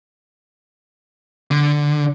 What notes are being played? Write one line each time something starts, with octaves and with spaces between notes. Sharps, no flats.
D3